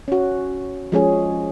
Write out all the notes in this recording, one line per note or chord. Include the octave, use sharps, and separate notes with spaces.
C#4 F#4
F3 G#3 C#4 G#4